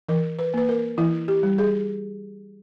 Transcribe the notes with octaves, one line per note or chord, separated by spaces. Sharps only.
E3 A#4
B4
A#3 B4
A#4
E3 E4
G4
G3
G#4